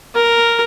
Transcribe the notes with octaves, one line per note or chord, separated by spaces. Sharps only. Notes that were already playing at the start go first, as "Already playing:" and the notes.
A#4